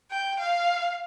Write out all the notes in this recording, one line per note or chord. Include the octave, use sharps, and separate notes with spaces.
G5
F5